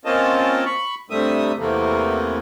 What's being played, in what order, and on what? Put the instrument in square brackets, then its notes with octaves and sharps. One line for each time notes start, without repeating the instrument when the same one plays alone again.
[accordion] A#3 C4 C#4 F4 D#5 A5
B5 C#6
G2 C3 G3 A3 E5 D#6
E2 C3 E3 A3 A#3